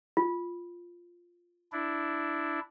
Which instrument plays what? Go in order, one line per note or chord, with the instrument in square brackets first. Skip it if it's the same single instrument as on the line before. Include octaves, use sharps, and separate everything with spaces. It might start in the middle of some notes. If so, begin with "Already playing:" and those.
[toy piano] F4
[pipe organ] D4 E4